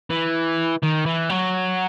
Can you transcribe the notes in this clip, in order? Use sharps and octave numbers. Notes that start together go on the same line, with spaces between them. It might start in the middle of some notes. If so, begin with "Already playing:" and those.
E3
D#3
E3
F#3